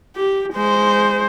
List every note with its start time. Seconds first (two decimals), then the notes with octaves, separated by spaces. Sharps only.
0.16 G4
0.53 G#3 C5